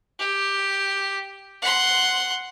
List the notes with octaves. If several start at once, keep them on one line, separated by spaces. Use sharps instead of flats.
G4
F#5 C6